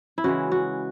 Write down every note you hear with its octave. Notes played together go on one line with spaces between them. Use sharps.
E4
C#3 E3 G#3 F#4
F#4